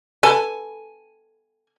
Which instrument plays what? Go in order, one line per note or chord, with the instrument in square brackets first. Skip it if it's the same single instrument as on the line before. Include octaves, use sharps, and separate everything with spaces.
[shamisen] A4 B4 [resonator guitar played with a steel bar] G#5